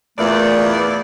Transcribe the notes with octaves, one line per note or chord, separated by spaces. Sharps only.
E2 A#2 E3 A3 D5